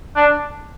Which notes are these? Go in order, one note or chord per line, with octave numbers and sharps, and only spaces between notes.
D4